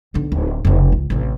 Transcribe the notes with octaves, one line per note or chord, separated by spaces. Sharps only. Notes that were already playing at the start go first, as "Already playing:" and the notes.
B1 D3
D1
F1 C#3
C#2
A1 C3